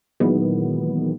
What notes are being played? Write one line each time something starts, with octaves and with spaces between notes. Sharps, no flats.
A#2 D#3 E3 F#3 G#3 B3